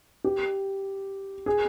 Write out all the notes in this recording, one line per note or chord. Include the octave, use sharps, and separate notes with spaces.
G4
G#4